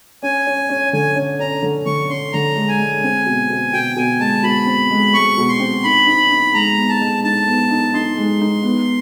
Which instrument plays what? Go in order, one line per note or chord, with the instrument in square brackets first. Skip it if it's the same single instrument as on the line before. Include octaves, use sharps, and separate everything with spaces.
[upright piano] C#4 [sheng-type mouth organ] G#5
[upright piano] C#4
C#4
[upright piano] D3 [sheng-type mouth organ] G#5
[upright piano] C#4
[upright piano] C#4 [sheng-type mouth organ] A#5
[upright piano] D3
[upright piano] D3 [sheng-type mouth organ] C#6
[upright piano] C#4 [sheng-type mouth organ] C6
[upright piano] D3 [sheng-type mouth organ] A#5
[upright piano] G#3
[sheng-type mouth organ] G#5
[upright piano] G#3
C4
B2
B2
[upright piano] B2 [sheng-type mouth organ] G5
[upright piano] B2 [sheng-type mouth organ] G#5
[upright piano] G#3 [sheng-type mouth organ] A5
[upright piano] B2 [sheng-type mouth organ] B5
[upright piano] C4
G#3
[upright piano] G#3 [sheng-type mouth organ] C#6
[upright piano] B2
[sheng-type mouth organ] C6
[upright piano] C4
[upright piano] D#4 [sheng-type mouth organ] B5
[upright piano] D#4
D#4
[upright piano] G#3 [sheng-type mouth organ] A#5
[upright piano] B3
[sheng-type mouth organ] A5
[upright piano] G#3
[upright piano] D#4 [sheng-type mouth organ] A5
[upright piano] B3
D#4
[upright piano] D#4 [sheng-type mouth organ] C6
[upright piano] G#3
D#4
B3